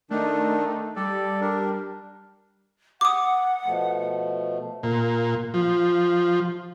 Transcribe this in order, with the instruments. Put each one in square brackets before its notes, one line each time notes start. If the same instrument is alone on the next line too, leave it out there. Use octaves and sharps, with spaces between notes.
[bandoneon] D#3 D4 [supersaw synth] A3 D#4
[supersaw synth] G3 [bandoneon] A4 D5
[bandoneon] D4 A#4
[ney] F#5 [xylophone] D6 D#6
[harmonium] B2 F3 A3
[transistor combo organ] A#2
F3